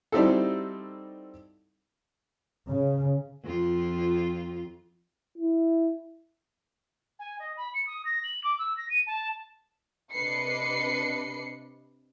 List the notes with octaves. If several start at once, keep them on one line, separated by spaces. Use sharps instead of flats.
G3 C4 D#4 E4 F#4 A4
C#3
F2 F4
E4
G#5
D#5
B5
C#7
D#6
A#6
F#7
D6
E6
A#6
D#7
A5
C3 D4 B4 D#5 C7 C#7